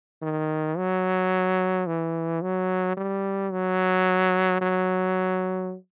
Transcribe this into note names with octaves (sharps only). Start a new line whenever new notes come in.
D#3
F#3
E3
F#3
G3
F#3
F#3